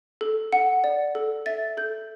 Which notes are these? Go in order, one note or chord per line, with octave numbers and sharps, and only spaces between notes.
A4
F#5
D5
A4
E5 A6
A4 G6